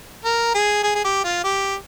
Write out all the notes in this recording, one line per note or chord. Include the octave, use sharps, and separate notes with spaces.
A#4
G#4
G#4
G#4
G4
F4
G4